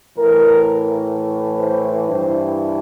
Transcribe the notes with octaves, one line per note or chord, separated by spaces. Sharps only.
A2 E3 A#4
C5
G2 E3 C5